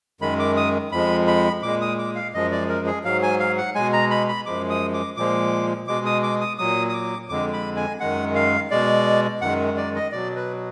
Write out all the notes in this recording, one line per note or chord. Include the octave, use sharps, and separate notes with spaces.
F#2 D#3 G#3 B5
D6
D#6
F2 F3 G#3 B5
B5
A#2 G#3 D6
D#6
D6
F5
F#2 F3 G#3 D#5
D5
A#4
G#4
G#2 F#3 F5
G#5
F5
F#5
B2 G#3 G#5
A#5
B5
B5
F#2 F3 G#3 D6
D#6
D6
A#2 F3 G#3 D6
B2 G#3 D6
D#6
D6
D#6
A#2 F#3 D#6
D#6
D6
F2 D3 G#3 D6
B5
G#5
F#2 D#3 G#3 F#5
F5
B2 G#3 D5
F#2 D#3 G#3 F#5
D5
D#5
B2 F#3 D5
B4